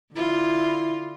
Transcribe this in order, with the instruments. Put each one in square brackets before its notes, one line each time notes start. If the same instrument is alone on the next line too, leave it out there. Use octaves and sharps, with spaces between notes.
[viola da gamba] D3 F4 [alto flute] E4